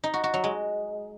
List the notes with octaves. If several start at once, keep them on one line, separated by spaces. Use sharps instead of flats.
D#4
F#4
F#4
F#3
G#3